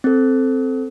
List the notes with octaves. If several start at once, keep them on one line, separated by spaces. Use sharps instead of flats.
C4 A4